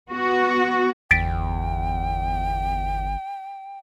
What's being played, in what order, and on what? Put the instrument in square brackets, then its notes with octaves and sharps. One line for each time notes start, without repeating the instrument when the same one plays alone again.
[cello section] B3 F#4
[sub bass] G1 [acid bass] E2 [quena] G5 [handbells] A6 B6 D7